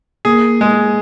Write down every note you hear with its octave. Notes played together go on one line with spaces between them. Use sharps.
A#3 G#4
G#3